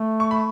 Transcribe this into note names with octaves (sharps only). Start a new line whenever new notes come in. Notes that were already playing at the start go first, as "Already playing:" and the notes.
Already playing: A3
C#6
B5